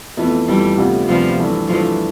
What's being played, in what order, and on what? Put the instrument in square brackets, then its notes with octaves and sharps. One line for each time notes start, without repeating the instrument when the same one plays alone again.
[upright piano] F2 E3 A3 [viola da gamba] B3
[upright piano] F2 E3 A3 [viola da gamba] G3
[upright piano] D2 C3 G3 B3 F4
[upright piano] D2 C3 G3 B3 F4 [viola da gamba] F3
[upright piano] G2 E3 A3
[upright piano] G2 E3 A3 [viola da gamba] F3